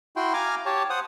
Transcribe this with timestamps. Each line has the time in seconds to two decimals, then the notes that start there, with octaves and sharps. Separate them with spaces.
0.16 E4 F#4 G5 C6
0.34 F5 G#5 A#5 D6 F6
0.66 G4 C#5 A5
0.90 C5 F#5 D#6